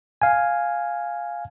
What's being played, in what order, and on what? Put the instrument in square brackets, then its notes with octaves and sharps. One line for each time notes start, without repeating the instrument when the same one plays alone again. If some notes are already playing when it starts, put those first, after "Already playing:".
[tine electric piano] F5 G#5